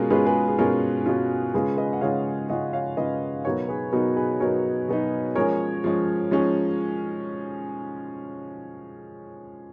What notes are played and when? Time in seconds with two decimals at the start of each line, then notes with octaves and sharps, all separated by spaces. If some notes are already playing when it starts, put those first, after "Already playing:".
Already playing: B2 G#3 C#4 F4 G#4 A#4
0.10 B2 G#3 C#4 F4 G#4 B4
0.26 G#4 B4
0.48 G#4
0.58 B2 G#3 C#4 F4 A#4
1.06 B2 G#3 C#4 F4
1.54 C#3 G#3 C#4 F4 G#4 B4
1.77 B4 D#5
1.93 F#5
2.01 C#3 G#3 C#4 F4 C#5 F5
2.49 C#3 G#3 C#4 F4 D#5 F#5
2.73 C#5 F5
2.97 C#3 G#3 C#4 F4 B4 D#5
3.45 B2 F#3 B3 D#4 A#4 C#5
3.69 G#4 B4
3.92 B2 F#3 B3 D#4 A#4
4.17 G#4 B4
4.40 B2 F#3 B3 D#4 A#4 C#5
4.88 B2 F#3 B3 D#4
5.35 F3 G#3 C#4 A#4 C#5
5.84 F3 G#3 C#4
6.31 F3 G#3 C#4